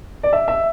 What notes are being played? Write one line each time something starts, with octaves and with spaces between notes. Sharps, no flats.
D5
E5
E5